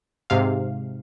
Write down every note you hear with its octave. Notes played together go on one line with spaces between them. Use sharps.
G#2 C3 F5